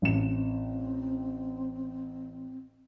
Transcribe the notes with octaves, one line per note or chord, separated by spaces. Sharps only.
A1 C4 E7